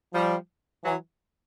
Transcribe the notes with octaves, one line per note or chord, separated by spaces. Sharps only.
F3 G3
E3 F#3